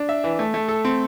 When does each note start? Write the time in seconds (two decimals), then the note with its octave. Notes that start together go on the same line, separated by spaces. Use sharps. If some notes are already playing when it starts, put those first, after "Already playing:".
Already playing: D4
0.09 E5
0.24 E3
0.39 A3
0.54 A3
0.68 A4
0.85 C4